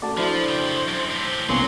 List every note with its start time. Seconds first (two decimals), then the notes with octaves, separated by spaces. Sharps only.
0.02 A3 F#4 D5 A5
0.18 F3 D4 E4 C5
0.48 C#3 G5
0.87 F#2
1.11 A2 G4
1.49 C2 F#3 A#3 B3 C#4 C6